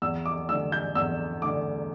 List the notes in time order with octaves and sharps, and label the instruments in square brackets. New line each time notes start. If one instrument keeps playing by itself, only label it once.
[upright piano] E2 E6
D6
A3 E6
D3
G6
E2 E6
D3 A3 D6